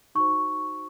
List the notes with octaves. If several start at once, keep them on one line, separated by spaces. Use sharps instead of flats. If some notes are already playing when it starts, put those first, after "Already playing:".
D#4 F#4 C5 C#6